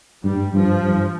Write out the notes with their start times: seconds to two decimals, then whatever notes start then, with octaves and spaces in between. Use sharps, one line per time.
0.24 G2 G3
0.54 G2 F3
0.83 G2